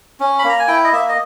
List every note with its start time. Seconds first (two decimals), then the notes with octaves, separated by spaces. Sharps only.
0.20 C#4
0.39 B5
0.44 A#3
0.49 A#5
0.59 G#5
0.68 E4 G5
0.84 D#5
0.93 A#3 E5
1.09 D#5